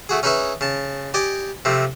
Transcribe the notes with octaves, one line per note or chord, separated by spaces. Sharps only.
A3 F#4 G#4
C#4 D#4 G#4 B4 E5 C#6
C#3 A5
G4 D5 D#5 G5 G#5
C3 F3 A3